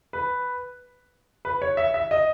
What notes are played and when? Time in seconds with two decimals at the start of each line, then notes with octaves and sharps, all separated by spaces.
0.13 B4
1.45 B4
1.62 C#5
1.77 E5
1.94 E5
2.11 D#5